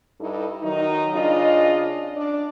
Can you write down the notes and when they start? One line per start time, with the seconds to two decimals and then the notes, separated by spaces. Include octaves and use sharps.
0.21 G2 D#4 E4 A4
0.63 D#3 F#3 D#4
1.14 C#3 D4 F4 D#5
2.16 D4 D5